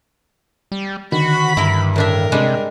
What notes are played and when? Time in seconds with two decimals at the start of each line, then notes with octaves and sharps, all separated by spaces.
0.72 G3
1.12 D3 D#3 F#4 B5
1.57 G2 E4 A#4
1.96 A2 D4 A#4 E5
2.32 C3 G3 G#3 D4